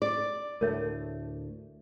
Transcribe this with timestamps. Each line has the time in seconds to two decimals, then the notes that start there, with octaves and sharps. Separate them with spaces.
0.02 D5
0.61 D2 A2 A3 A#4 C#5 E5